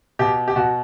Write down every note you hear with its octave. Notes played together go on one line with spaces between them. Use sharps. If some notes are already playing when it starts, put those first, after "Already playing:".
B2 G4
G4
B2 F#4